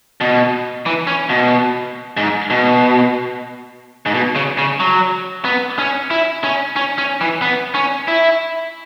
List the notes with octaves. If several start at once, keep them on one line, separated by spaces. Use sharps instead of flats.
B2
E3
C#4
B2
G#2
B2
G#2
B2
C#3
C#3
F#3
B3
C#4
E4
C#4
C#4
C#4
E3
B3
C#4
E4